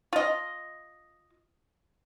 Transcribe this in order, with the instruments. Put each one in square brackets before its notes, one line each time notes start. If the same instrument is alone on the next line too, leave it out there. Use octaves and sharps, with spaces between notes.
[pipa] F4 D#5